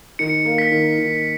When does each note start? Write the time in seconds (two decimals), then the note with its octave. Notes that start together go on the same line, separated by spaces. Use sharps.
0.19 D#3 C#7
0.45 A#3
0.58 B6
0.71 D#3
0.98 D#3